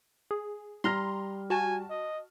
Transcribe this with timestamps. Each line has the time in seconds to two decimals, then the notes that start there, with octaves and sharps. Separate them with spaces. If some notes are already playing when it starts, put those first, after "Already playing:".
0.31 G#4
0.84 G3 A#5 C6 F6 A#6
1.50 F#4 G#5 A5
1.89 D#5